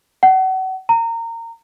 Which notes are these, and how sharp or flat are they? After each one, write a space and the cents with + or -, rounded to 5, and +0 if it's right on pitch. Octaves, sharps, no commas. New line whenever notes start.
F#5 +35
A#5 -20